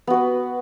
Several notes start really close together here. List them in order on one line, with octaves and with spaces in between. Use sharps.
B3 F#4 B4